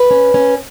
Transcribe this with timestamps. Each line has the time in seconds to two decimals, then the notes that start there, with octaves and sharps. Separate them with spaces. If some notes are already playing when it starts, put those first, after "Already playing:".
Already playing: B4
0.11 C#4
0.34 C#4